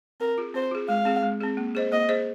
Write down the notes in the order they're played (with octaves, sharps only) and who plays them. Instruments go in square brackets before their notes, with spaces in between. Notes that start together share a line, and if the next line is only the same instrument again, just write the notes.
[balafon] C4 [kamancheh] A#4
[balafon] F4 G#4
[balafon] C4 [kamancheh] C5
[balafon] F4 G#4
[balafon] G#3 [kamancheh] F5
[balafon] C4 G#4
G#3
C4 G#4
A#3
G#4 C5 D#5
[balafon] A#3 [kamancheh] D#5
[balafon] G#4 C5 D#5